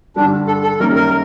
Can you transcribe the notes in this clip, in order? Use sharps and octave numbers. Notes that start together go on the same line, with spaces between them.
G2 D3 G3 D4
A4
A4
F#2 D#3 G3 A#3 A#4
A#4